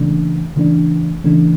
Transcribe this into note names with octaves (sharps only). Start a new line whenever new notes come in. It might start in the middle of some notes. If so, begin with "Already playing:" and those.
Already playing: C#3 E3 A3 D4
C#3 E3 A3 D4
C#3 E3 A3 D4